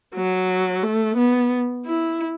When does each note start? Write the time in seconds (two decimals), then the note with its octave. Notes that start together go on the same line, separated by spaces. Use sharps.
0.15 F#3
0.83 A3
1.17 B3
1.86 E4